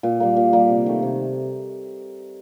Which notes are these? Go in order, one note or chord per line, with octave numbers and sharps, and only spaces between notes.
A#2
G3 A#3
A#2
G3 A#3
C3
D#3 A3
C3